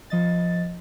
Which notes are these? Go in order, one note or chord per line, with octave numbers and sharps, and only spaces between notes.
F3 D#5 A6